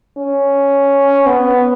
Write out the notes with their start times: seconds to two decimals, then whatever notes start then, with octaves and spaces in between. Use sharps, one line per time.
0.17 C#4
1.26 B3